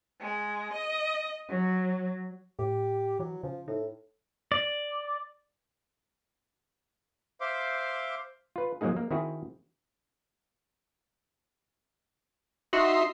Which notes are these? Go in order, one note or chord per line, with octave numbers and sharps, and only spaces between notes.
G#3
D#5
F#3
A2 G4
E3 F#3
C#3 F3
A2 D#4
D5
C5 E5 F5 C6 D6
F4 B4
F3 F#3 G#3 A#3 D#4 G#4
A#3
D#3 C4 E4 F#4 G#4
D#4 F#4 E5 C6